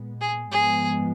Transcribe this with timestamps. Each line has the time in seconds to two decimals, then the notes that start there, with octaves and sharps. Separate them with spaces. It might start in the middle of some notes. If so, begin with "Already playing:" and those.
Already playing: A#2 G#3 B3
0.21 G#4
0.51 G#2 F3 G#3 B3 G#4